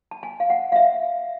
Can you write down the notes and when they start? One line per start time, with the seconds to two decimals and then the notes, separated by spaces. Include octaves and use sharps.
0.11 A5
0.23 G#5
0.40 F5
0.50 F#5
0.72 F5
0.76 E5